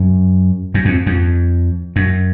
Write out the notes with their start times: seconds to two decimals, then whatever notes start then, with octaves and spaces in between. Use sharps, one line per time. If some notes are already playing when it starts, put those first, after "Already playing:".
Already playing: F#2
0.74 F#2
0.85 F2
1.06 F2
1.96 F#2